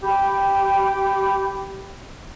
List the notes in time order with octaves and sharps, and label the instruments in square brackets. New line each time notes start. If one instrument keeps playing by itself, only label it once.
[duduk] G4 [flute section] G5 B5